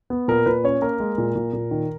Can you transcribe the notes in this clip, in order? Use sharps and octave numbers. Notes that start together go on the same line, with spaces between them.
B3
A#2 A#4
A#2 B4
C#4 C#5
A#3 A#4
G#3
A#2
A#2
A#2
D#3